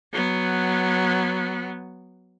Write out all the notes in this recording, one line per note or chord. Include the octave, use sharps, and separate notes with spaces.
F#3 B3